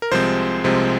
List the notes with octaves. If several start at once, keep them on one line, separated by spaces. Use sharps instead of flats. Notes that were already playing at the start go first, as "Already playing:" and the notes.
A#4
C2 C3 F3 G#3 C4 C5
C2 C3 F3 G#3 C4